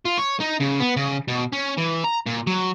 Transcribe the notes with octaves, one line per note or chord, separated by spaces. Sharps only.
F4
C#5
D#4
C#3
B3
C#3
B2
C#4
E3
A#5
A#2
F#3